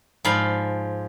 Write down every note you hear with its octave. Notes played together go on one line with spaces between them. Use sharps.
G#2 F3 D5 F5 B5